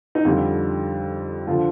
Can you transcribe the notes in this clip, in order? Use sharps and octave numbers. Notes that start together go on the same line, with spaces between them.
D#4
F2 D3 G3 F4
D3 F3 F4